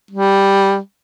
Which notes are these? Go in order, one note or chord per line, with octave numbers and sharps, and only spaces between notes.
G3